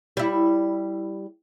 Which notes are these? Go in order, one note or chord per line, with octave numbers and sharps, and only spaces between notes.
G3 E4